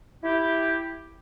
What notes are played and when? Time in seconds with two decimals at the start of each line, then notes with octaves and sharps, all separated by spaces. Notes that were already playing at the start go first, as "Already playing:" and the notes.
0.23 E4 G4